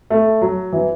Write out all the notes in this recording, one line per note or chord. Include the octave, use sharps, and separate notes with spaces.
A3
F#3
E3